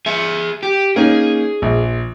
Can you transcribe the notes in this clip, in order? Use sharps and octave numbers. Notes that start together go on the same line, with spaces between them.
G#4 E5
G4
A#3 C#4 D#4 G#4
A#1